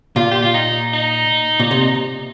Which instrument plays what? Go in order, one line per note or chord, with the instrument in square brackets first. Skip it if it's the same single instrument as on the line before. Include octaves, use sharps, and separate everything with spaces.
[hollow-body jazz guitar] A#2 [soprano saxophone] F4
[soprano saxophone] G4
F4
D#4
D#4
[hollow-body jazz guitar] A#2
C3